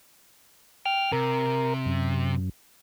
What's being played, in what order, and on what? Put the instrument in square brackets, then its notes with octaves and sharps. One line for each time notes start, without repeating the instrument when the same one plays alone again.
[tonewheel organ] G5 F6
[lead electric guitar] C3 [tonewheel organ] A#4
[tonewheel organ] F#2